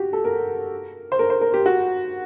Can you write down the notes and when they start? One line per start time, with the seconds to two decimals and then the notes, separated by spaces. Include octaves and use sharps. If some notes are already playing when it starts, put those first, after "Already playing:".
Already playing: F#4 G4
0.13 A4
0.25 A#4
1.12 C5
1.19 A#4
1.30 C5
1.41 A#4
1.54 G4
1.66 F#4